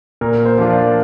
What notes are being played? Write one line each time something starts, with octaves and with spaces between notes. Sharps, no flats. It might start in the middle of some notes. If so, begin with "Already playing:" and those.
A#2 A#4
C5
F3 A#3 D4 F4
D5